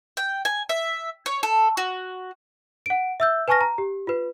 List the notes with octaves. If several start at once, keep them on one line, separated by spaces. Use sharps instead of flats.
G5
G#5
E5
C#5
A4
F#4
F#5 D7
E5 E6 G6
B4 G#5 A5 C#6 F6 A#6
A#5
G4
F4 B4